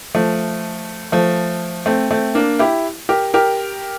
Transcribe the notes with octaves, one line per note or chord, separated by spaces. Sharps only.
F3 A3
F3 A3
A3 C4
A3 C4
A#3 D4
E4 G4
G4 A#4
G4 A#4